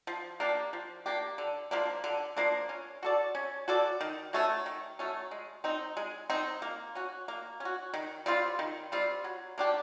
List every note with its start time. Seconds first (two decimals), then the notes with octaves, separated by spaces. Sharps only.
0.07 F3
0.40 A#3 D4 G4
0.73 F3
1.06 A#3 D4 G4
1.38 D3
1.71 F3 A#3 D4
2.04 D3
2.37 F3 A#3 D4
2.69 C#4
3.03 F#4 A4 D5
3.35 C#4
3.68 F#4 A4 D5
4.01 D#3
4.33 F#3 A3 C#4
4.66 D#3
4.99 F#3 A3 C#4
5.31 G#3
5.64 C4 D#4
5.97 G#3
6.30 C4 D#4
6.62 A#3
6.95 C#4 F#4
7.28 A#3
7.60 C#4 F#4
7.94 D#3
8.26 G3 C4 F4
8.59 D#3
8.92 G3 C4 F4
9.24 F#3
9.58 A#3 D4 G4